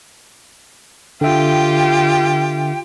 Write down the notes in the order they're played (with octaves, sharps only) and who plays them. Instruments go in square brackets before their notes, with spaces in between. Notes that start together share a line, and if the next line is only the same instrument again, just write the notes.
[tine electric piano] D3 E5 [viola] F4 G4 [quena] G5